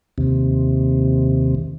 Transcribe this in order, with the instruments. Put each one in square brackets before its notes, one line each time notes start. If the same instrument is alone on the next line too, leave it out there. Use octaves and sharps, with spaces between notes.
[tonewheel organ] D#2 C3